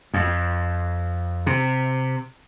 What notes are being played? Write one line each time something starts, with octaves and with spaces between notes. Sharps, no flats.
F2
C3